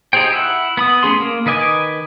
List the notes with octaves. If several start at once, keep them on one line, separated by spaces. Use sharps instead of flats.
D#4 G4 G#4 C5 G5
E4 E5 F#5
B3 B5 D#6
A3 C#4 G#4 C6
A#3
D#3 B4 D#5 G#5 D6